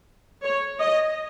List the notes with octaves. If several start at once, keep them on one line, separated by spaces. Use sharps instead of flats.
C#5
D#5